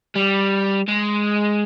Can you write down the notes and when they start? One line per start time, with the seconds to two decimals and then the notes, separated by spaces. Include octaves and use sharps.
0.16 G3
0.88 G#3